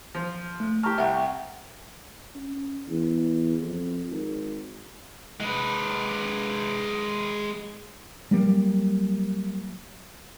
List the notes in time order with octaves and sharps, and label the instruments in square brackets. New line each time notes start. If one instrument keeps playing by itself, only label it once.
[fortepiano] F3
[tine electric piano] A3
[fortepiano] G4 A5 [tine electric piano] A#5 C#6 F6
[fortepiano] C2 [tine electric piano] E5 F#5 G5
[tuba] C#4
E2
F2
G#1
[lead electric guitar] G#3 B4
[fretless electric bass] F#3 G3 A#3